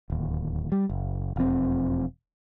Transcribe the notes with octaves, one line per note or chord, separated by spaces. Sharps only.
D1 D#2
G3
F#1
E1 F2 C4